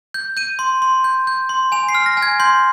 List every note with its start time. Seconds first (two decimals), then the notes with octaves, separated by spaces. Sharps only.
0.14 G6
0.37 G6 D#7
0.59 C6
0.82 C6
1.04 G6
1.27 G6
1.49 C6
1.72 G#5 F7
1.89 C7
1.95 F6
2.06 A#6
2.17 G#5
2.22 G#6
2.40 C6 G6